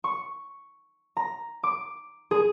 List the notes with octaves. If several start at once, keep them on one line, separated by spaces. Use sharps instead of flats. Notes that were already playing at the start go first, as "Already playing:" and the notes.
C#6
A#5
D6
G#4